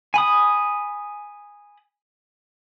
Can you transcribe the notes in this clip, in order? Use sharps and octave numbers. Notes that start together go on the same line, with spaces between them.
G#5 B5 D#6